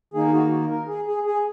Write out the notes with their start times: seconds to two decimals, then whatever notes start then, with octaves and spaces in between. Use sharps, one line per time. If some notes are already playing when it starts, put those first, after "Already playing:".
0.14 D#3 A#3 D#4 G#4
0.27 G#4
0.33 F#4
0.70 A#4
0.88 G#4
1.06 G#4
1.25 G#4